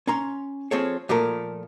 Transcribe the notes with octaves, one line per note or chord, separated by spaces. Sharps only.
C#4 A#5 C6
F3 C4 G#4 A4 C#5
A#2 F3 A3 A4 A#4